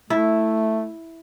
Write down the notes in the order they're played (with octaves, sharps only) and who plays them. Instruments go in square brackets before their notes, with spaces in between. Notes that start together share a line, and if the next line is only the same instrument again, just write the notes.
[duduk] A3 [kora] E4